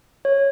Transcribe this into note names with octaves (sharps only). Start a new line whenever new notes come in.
C#5